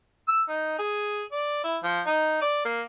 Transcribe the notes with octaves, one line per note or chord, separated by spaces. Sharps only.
E6
D#4
G#4
D5
E4
F3
D#4
D5
A#3